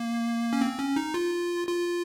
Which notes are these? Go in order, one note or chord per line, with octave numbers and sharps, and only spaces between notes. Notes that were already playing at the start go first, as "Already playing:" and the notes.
Already playing: A#3
C#4
C4
C#4
D#4
F4
F4